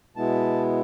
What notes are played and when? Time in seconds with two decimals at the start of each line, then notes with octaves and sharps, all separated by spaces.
0.16 B2 G#3 B3 E4 A5